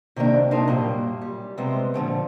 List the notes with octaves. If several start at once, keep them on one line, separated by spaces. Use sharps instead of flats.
C3 D#3 G3 A#3 D4
F#2 C3 D#4 A#4 F5 A5
F#2 A#2 G3
G3
C3 G3 G#3 B3 C4
A#2 D3 E3 F3